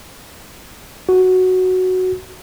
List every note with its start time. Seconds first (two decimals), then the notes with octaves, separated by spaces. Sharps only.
1.09 F#4